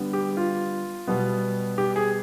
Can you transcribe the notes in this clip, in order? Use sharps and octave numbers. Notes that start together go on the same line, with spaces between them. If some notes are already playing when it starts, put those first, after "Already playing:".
Already playing: D3 G3 B3
G4
F4
B2 G3 B3
G4
G#4